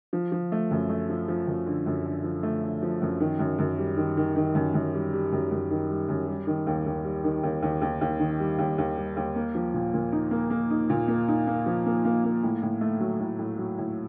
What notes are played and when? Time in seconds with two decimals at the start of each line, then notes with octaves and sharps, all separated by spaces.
0.13 F3
0.32 F3
0.52 A3
0.71 F#2
0.89 A3
1.10 F3
1.28 F3
1.47 F#2
1.66 D3
1.86 F#2
2.05 D3
2.24 F3
2.43 A3
2.63 D3
2.83 F3
3.02 F#2
3.20 D#3
3.39 F#2
3.59 F#2
3.78 G3
3.97 D#3
4.17 D#3
4.36 D#3
4.55 F#2
4.74 F#2
4.94 G3
5.13 G3
5.32 F#2
5.51 F#2
5.71 D#3
5.90 G3
6.09 F#2
6.27 G3
6.47 D#3
6.67 D#2
6.86 D#2
7.04 G3
7.24 D#3
7.43 D#2
7.62 D#2
7.82 D#2
8.01 D#2
8.20 D#3
8.40 G3
8.59 D#2
8.78 D#2
8.98 G3
9.17 D#2
9.36 A#3
9.55 F3
9.74 A#2
9.94 A#2
10.12 D#4
10.31 A#3
10.50 A#3
10.70 D#4
10.90 A#2
11.08 A#3
11.28 D#4
11.47 A#3
11.66 F3
11.86 A#3
12.05 A#3
12.24 A#3
12.43 A2
12.62 A2
12.81 A3
13.00 F#3
13.20 A2
13.39 A2
13.58 F#3
13.78 A2